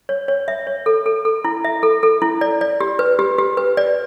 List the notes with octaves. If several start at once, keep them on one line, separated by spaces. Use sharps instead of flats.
C#5
C#5
E5
C#5
A4
A4
A4
E4
E5
A4
A4
E4
D5
D5
G4
B4
G4
G4
B4
D5